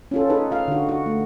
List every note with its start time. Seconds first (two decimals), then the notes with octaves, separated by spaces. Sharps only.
0.11 C#4 F4 A4
0.30 D#4 G#4 A4 B4
0.51 F4 F5
0.68 D3 F#4
0.89 F#4
1.06 A3